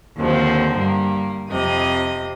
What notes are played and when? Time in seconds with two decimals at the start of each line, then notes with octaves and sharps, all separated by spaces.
0.19 D#2 D3 F3 C4 C5
0.76 G2 A#3
1.50 F2 C3 D#5 D#6